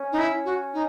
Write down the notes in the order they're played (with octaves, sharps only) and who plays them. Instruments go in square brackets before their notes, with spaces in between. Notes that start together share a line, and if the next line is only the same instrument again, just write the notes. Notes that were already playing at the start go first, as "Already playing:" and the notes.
Already playing: [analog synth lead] C#4
[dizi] D#4
E4
F#4
D#4